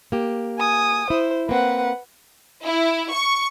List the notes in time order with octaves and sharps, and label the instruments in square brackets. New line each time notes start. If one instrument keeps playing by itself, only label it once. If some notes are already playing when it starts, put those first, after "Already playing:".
[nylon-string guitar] A#3 G4
[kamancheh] G#5 D#6
[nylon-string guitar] E4 [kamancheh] C5
[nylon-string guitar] A#3 C4 [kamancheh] B4 F#5
[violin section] E4
C#6